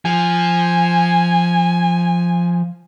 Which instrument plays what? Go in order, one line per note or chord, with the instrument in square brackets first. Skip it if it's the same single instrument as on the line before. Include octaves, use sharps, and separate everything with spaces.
[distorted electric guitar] F3 [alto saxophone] G#5